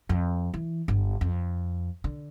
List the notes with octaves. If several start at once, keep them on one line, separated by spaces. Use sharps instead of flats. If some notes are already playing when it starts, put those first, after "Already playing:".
F2
E3
G1
F2
D3